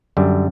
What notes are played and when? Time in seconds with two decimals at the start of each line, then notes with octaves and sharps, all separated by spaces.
0.17 F#2 D3 G3